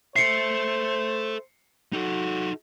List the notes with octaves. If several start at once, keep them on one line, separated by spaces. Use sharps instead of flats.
A4 C5 E5 C7 C#7
D#4 F#4 A4